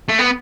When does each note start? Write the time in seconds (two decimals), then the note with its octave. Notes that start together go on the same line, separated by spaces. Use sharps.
0.09 A3
0.19 B3